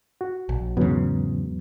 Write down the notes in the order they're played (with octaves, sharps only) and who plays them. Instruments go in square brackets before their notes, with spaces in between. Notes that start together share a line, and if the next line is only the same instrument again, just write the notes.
[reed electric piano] F#4
[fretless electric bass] A#1
[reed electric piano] E2 F#3 B3 [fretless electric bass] G#2 C#3